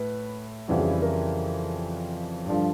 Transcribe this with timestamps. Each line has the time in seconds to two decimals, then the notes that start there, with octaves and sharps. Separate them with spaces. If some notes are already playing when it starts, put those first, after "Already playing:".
Already playing: A2 B4
0.68 F2 C#3 E3 G3 F#4
0.80 G#4
0.91 E4
1.02 A#4
2.46 G2 D3 F3